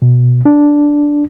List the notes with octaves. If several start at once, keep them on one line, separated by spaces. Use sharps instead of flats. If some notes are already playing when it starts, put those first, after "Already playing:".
B2
D4